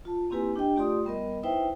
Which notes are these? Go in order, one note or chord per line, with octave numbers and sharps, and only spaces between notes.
F4 A5
A#3 C4 E4 G4 B4 G#5
D4 G4 D#5 G5
A3 F4 G4 D5 C6 D#6
G3 B3 A#4 D#5
D#4 E4 B4 C5 E5 G5